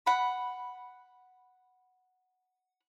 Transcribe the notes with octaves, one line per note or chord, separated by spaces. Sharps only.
F#5 B5